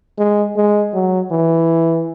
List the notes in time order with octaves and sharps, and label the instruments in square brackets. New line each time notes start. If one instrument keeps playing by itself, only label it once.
[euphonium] G#3
G#3
F#3
E3